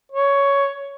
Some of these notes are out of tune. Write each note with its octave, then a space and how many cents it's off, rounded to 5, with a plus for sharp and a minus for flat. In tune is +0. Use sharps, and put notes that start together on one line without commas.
C#5 +10